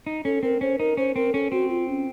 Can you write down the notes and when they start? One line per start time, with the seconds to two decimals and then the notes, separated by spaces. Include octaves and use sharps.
0.07 D#4
0.25 C#4 A4
0.43 C4 A#4
0.61 C#4 C5
0.79 D#4 A#4
0.97 C#4 C5
1.16 C4 A#4
1.34 C#4 A4
1.52 C4 F#4
1.70 F4
1.88 C#4